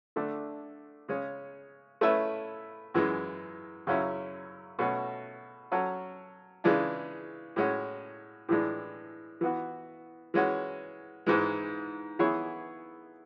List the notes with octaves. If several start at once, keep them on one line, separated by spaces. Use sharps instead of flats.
D3 A3 D4
C#3 G#3 C#4
A3 C#4 E4 B4 E5
F#2 E3 G#3
F#2 C#3 F#3 C#4 E4
B2 A3 C#4 F#4
F#3 C#4 F#4 A4
C#3 E3 G#3 D4
A2 G#3 C#4 F#4
A2 E3 G#3 D4
E3 B3 F#4
E3 G#3 C#4 F#4
G#2 E3 G#3
E3 B3 E4 G#4 C#5